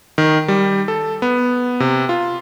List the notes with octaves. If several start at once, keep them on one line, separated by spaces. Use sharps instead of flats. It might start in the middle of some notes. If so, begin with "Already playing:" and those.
D#3
G3
A4
B3
C3
F4